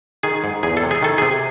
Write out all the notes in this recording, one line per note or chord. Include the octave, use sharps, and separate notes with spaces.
D#3 G#4
G#2
E2 G#4
A4
C3
G#4
D#3 A4
C3 G#4